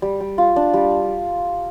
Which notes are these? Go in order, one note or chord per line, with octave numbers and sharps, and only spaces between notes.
G3
G3
F4
D4
G3